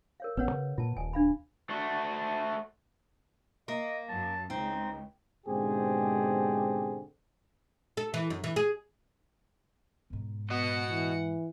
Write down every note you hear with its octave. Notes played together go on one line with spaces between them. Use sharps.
A#4 C#5 F5
A1 B3 C#4 B4 C#5 F#5
C#3
A#2 F4 A5
D#1 G#5
D4 F5 B5
A3 F#4
A#3 D#5
F#2 A5
C#2 C4 D#4
G#2 B2 D3 C4 G4 G#4
A4
E3
F#2
E3
G#4
G#2 B2
B3 F#4 D#5 F#5 C#7
E3